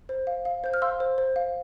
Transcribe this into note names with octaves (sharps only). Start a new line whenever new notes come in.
C5
F5
F5
C5 G6
F6
F5 C6 E6
C5
C5
F5